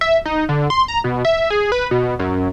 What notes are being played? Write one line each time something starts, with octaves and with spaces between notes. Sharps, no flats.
E5
D#4
D3
C6
A#5
B2
E5
G#4
B4
B2
F#2